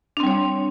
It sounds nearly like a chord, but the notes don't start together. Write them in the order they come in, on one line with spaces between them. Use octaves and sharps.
D4 C4 G3 C#5